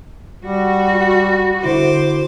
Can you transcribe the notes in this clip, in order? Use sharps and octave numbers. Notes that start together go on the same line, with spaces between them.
G3 F#4
D3 E4 F#4 C5 D6